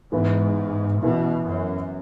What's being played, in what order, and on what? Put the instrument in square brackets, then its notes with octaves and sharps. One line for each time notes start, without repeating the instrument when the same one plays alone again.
[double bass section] G#2 [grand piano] E3 B3 E4
[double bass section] B2 [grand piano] E3 B3 E4
[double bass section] F#2